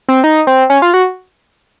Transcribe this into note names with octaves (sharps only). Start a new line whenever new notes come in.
C4
D#4
C4
C#4
F4
F#4